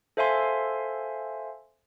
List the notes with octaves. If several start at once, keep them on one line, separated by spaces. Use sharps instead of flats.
A4 C5 E5 F5 G#5 C6